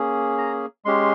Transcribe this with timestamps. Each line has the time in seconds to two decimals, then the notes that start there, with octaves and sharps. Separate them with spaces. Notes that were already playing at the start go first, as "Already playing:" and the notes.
Already playing: A#3 C#4 G#4
0.38 A#5
0.85 G#3 C#4 G4 C6